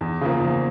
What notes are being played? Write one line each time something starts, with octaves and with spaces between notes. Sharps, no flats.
E2
C#3 F3 A#3
E2